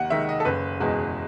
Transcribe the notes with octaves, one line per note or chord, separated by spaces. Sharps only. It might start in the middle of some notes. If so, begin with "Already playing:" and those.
Already playing: D#2 F#5
D#3 G#3 E5
D#5
A4
F#1 B4
E2 B2 G#3